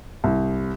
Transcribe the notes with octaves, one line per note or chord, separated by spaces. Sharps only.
C2